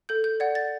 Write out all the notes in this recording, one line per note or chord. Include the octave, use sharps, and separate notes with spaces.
A4 G6
G6
D5 F#5 G#6
A6